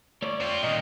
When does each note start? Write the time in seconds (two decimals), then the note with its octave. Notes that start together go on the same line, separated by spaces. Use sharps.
0.22 A3 C#5 D5
0.40 C4 F4
0.63 A#2 D#3 D#5